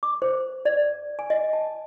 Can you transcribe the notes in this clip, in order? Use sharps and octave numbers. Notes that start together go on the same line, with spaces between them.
D6
C5
D5
G#5
D#5
A5